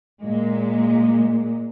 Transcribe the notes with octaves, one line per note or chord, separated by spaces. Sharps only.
A#2 G#3